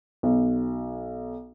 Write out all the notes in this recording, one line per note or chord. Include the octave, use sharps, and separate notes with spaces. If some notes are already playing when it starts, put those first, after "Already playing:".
B1